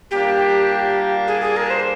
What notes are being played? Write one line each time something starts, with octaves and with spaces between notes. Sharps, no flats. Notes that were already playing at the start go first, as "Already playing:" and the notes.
A#2 G3 A#3 D4 G4
G#4
G#4
A#4
C5